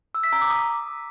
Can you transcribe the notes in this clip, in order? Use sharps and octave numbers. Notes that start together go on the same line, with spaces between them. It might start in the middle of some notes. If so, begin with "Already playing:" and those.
E6
B6
A#5
D6
D#6